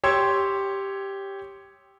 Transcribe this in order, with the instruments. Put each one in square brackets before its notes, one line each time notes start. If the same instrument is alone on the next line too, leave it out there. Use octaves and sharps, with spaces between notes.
[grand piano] G4 C#5 C6 E6 G#6